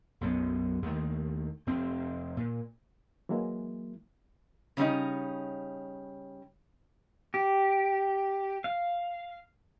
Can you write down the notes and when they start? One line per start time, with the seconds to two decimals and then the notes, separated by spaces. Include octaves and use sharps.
0.21 B1 F#2 F#3 B3
0.82 D#2 D#3 A3
1.67 F1 C4
2.37 A#2
3.29 E3 F#3 G#3 A#3 E4
4.77 C#3 G3 C#4 D#4
7.34 G4
8.64 F5